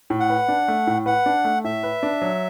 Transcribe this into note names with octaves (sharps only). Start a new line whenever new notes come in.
A2
F#5
B4
D4
A3
A2
B4 F#5
D4
A3
A2 E5
B4
D4
F#3